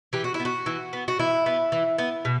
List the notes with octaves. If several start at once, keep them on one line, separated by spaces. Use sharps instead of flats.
E3 G4
F#4
E4
B3
F#4
E3
B3
F#4
E3 E4
B3
E3
B3
B2